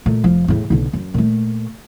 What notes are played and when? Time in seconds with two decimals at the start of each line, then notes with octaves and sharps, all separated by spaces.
0.06 A#2 A3
0.24 F1 F3
0.48 E2 A2
0.70 B1 D3
0.93 F#2
1.14 A#2 A3